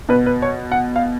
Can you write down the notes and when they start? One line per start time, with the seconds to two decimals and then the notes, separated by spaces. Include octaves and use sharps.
0.09 B2 B4
0.26 B4
0.42 C#5
0.72 F#5
0.96 F5